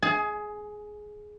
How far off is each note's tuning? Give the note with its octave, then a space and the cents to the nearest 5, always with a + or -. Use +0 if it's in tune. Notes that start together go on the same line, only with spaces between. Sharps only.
G#4 +15 G#5 +40